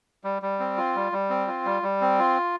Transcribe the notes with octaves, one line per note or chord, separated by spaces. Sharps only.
G3
G3
C4
F4
G3
G3
C4
F4
G3
G3
C4
F4